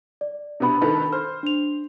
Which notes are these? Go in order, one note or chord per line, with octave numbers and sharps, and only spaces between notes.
D5
C3 B3 D4 B5
D#3 A4 B4
C5 F6
D4 F7